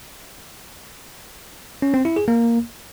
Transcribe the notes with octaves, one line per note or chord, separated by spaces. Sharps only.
C#4
C4
E4
G#4
A#3